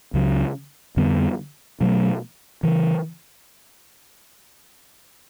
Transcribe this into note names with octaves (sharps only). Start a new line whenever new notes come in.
C#2 C#3 F#3
F2 D3 G3 B3
B2 F#3 A3
C#3 E3